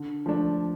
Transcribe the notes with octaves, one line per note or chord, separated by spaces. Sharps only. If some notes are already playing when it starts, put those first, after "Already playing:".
Already playing: D3
F3 A3 D4